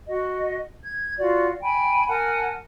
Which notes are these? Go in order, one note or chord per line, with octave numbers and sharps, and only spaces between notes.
F#4 D#5
G#6
F4 F#4 D5
G5 G#5 B5
A#4 F#5 G#5 A5